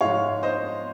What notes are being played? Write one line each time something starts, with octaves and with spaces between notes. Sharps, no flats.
G#2 F3 G#3 C#5 F5
C5 D#5